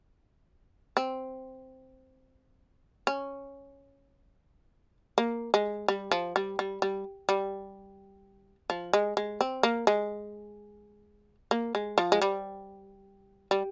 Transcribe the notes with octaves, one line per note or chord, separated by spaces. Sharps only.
C4
C#4
A#3
G#3
G3
F3
G3
G3
G3
G3
F3
G#3
G#3
C4
A#3
G#3
A#3
G#3
F3
G#3
G3
G3